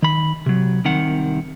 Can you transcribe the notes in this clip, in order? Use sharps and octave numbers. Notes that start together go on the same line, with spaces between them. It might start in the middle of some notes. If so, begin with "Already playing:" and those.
D#3 B5
C3 F#3
C2 C3 D#3 F#5